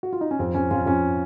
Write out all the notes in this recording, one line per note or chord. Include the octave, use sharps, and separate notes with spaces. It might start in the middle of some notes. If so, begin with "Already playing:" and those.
F#4
F4
D#4
C#4
F2 C4
F2 C#4
F2 C#4 F4
F2 C#4